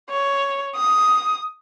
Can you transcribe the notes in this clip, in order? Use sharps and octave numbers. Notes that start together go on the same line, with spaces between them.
C#5
D#6